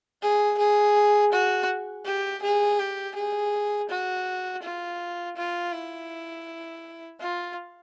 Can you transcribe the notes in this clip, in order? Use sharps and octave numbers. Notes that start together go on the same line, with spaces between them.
G#4
G#4
F#4
G4
G#4
G4
G#4
F#4
F4
F4
E4
F4